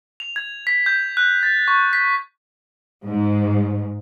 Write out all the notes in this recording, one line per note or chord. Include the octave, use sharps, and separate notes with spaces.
F7
G#6
B6
G6
F#6
A6
C#6
B6
G#2